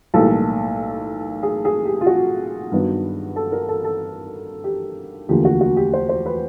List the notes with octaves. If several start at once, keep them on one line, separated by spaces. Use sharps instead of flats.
B1 A2 E3 G3 A#3 A4
G#4
G#4
G4
F4
F#4
G2 D#3 F#3 B3
A4
A#4
A4
A4
G4
E1 D2 D3 F3 A#3 G4
F#4
F#4
G4
C5
C5
B4